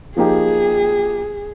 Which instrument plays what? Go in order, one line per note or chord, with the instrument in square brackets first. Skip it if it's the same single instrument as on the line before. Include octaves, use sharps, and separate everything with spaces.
[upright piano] F3 A#3 D#4 G4 [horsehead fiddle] G#4